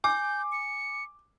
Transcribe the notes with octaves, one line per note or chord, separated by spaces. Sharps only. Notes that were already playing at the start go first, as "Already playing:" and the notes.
G#5 D6 G6
C#7